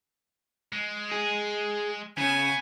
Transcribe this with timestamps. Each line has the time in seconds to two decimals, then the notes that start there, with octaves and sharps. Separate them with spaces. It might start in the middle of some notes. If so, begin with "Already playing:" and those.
0.73 G#3
1.12 G#4
2.18 C#3 B3 G#5